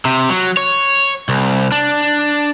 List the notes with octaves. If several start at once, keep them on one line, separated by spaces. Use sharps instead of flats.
C3
F#3
C#5
C2
D4